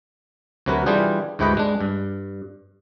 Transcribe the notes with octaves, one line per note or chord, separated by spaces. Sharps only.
D2 C3 F#3 A#4 B4
E3 G3 D4 F4 G4 G#4
D2 G#2 E4 G4 B4 D#5
G#3 D4
G2